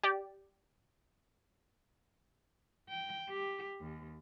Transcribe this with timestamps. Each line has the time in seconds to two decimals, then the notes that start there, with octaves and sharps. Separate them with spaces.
0.03 G4 D5
2.89 G5
3.29 G4
3.80 D#2